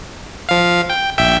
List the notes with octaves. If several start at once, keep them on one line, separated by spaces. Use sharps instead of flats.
F3 F5
G5
A#1 E5 G5